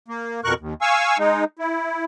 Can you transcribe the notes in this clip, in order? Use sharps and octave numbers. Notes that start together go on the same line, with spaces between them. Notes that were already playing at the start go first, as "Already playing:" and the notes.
A#3
F2 B2 A#4 C#6 F#6
D#2
F5 G#5 C#6 E6
G#3 D#4
E4